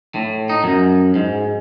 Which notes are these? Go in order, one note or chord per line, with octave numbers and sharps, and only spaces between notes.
A2
D#4
F#2
G#2